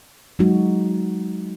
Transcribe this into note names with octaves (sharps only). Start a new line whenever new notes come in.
F#3 G#3 D#4 F#4